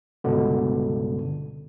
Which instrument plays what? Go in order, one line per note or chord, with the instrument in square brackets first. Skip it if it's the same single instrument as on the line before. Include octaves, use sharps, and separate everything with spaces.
[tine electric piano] G1 C#2 G2 B2 D3